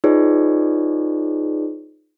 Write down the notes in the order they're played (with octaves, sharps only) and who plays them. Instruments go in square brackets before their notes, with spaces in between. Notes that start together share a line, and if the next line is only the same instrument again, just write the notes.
[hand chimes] D#4 F4 G#4 B4 C#5 D5